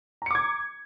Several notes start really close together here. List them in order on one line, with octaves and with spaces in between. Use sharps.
A#5 C#7 D6 G#6